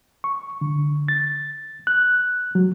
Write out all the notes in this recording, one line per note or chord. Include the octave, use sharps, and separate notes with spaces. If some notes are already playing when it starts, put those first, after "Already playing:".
C#6
D3
A6
F#6
F#3